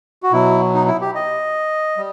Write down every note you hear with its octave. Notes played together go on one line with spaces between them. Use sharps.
F#4
B2 F#3 E4
D#4
E4
G4
D#5
G3